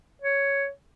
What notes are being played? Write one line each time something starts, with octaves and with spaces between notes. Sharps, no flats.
C#5